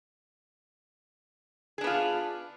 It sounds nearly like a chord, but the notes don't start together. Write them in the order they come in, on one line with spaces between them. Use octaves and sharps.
G#4 D4 B3 F4